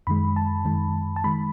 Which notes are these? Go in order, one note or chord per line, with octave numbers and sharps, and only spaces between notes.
F#2 D#3 G#3 B5
A5
F#2 D#3 G#3
A5
D#3 G#3 B5